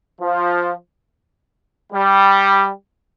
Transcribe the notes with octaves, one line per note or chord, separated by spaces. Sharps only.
F3
G3